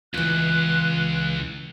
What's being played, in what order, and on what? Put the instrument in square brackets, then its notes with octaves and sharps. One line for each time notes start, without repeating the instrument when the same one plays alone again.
[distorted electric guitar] C#2 [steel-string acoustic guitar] E3 F4 [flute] F#6